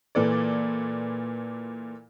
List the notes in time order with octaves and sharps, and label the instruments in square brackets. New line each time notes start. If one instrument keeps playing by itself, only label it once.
[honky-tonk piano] A#2 E3 A4 D5